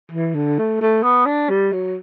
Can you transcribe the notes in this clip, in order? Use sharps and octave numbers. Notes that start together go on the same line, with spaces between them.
E3
D3
A3
A3
B3
D4
G3
F#3